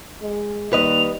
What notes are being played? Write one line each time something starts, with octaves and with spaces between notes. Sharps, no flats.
G#3
D#2 G3 B4 D#5 F7